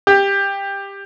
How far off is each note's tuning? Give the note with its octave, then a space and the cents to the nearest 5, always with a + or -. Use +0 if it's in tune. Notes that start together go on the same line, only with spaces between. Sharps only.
G4 +15